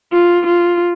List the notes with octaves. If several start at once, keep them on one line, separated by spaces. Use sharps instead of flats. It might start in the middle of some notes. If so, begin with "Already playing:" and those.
F4
F4